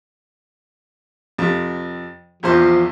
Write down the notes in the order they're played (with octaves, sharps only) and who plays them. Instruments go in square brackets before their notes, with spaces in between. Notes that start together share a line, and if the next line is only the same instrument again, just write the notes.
[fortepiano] F2 C3
[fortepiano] A#1 E2 C5 [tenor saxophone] F3